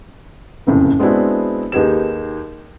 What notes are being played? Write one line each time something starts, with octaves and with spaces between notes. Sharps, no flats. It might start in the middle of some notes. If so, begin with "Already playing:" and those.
F#1 C2 F2 A2 C#3
G#3 B3 C4 D4 E4 F#4
D#2 D#4 G4 G#4 B4 E7